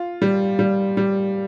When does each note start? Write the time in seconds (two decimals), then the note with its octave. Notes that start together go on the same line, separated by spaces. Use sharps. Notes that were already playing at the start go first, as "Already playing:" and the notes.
Already playing: F4
0.22 G3
0.59 G3
0.97 G3